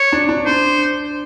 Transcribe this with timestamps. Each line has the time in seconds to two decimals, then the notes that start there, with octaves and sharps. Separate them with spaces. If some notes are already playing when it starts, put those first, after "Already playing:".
Already playing: C#5
0.13 D4
0.29 D4
0.46 D4 C5